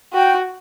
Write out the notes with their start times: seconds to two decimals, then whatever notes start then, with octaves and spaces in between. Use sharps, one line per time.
0.13 F#4 G5